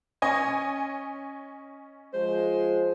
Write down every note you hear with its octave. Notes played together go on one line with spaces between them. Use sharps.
C#4 D#5 G#5
F3 G#3 C5